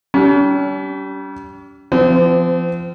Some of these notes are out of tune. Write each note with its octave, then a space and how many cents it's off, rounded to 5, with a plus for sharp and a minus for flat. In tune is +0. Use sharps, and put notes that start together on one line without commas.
G3 -25 C#4 +45
F3 -20 C4 -40